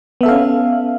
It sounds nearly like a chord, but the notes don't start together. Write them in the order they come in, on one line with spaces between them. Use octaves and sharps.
B3 E5 A4 F5 C#4